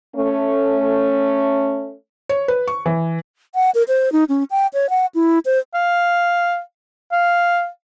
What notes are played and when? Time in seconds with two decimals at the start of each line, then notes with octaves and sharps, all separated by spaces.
0.15 A3 C#4
2.29 C#5
2.48 B4
2.68 C#6
2.86 E3
3.55 F#5
3.75 A#4
3.88 C5
4.12 D#4
4.29 C#4
4.51 G5
4.74 C#5
4.90 F#5
5.15 E4
5.45 C5
5.74 F5
7.12 F5